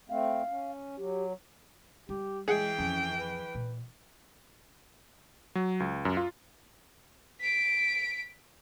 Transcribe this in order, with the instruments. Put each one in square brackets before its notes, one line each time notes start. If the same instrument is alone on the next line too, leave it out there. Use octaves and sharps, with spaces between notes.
[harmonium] A3 C4 [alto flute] F5
[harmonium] C#4
[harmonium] F#3 [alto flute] G4
[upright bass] G3 [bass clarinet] G4
[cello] E3 G5 [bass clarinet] G#3 [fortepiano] G#4
[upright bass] F2 [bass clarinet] C#4
[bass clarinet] B4
[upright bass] A#2
[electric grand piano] F#3
C#2
F#2
F4
[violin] B6 D7